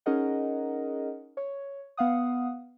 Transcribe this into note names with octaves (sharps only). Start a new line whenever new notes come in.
C#4 D#4 G#4 A#4 D#5 F#5
C#5
B3 F5 F#5 D#6